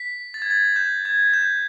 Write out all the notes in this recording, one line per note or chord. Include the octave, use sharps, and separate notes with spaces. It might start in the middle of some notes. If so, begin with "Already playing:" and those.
Already playing: B6
A6
G#6
A6
G6
G#6
G6